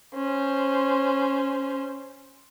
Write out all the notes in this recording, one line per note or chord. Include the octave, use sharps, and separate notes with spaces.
C#4 C5